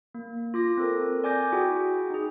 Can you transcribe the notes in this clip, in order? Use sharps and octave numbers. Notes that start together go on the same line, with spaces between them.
A#3
F4 D6 A#6
C4 A4 A#4
D5 G#5 D6 G6 A#6
E4 F#4 G#4 G5
D#4 G#4